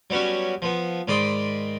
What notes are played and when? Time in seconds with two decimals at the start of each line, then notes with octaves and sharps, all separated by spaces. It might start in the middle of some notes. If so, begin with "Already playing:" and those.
0.10 F#3 G3 B3 C#4 F#4
0.62 F3 B3
1.08 G#2 D#3 D5 B5 C6 D#6